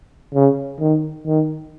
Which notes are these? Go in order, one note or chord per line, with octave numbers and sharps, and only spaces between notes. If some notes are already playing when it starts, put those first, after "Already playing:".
C#3
D#3
D#3